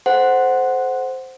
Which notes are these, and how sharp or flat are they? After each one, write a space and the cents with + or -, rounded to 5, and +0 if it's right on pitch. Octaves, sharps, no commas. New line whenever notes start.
A4 -25 C5 +0 F#5 +0